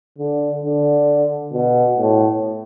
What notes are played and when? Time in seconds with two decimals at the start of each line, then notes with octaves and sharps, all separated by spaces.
0.18 D3
0.63 D3
1.53 B2
1.98 A2